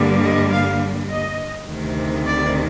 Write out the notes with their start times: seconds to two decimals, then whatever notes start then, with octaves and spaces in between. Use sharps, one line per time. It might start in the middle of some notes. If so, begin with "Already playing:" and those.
Already playing: G2 D3 G3 A#3
0.23 D#5
0.52 F5
1.10 D#5
1.68 D2 C3 D#3
2.26 D5